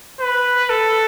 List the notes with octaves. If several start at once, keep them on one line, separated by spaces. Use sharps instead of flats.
B4
A4